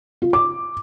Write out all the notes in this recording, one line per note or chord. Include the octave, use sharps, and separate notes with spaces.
F4
D6